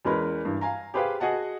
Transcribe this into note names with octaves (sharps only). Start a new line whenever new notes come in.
E2 G#3 C#4 A#4 B4 B5
G2 E3
F5 G#5 A#5
G4 G#4 B4 C5 F5 G5
F#4 G#4 D#5 F#5 A5